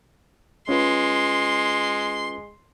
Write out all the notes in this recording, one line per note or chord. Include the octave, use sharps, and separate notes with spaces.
G#3 C#4 F4 B4 C6